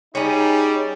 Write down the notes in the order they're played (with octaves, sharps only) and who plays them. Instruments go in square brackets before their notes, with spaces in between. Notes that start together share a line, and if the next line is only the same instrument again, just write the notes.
[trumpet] G3 [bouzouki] C#4 G#4 [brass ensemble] D#4